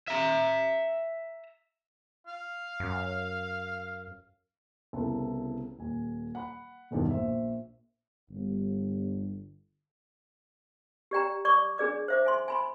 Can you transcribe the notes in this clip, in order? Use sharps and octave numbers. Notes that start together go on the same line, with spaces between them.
E5 A#5
F5
F#2
C2 C#3 B3 E4 A4
D#1 G#5
F#5 B5
E1 B1 G2 D#3
A#1 C5 E5
G1
G4 D5 G5 A#5
D5 C#6 D6
D4 G#4 D5 D6
C5 E5 D6
E5 G#5 C6
G#5 B5 C6